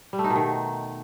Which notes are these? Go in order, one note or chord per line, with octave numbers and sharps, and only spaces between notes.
G3
A3
D#4
B2
D#3